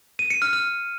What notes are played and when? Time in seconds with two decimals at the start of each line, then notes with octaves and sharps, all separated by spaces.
0.19 D#7
0.30 C#7
0.42 F6
0.53 F6